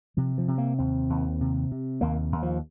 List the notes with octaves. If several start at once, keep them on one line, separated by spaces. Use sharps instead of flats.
C3 F3
F3
C3
A#3
D#2 C4
D#2
C3
C3
D#2 A#3
D#2
F3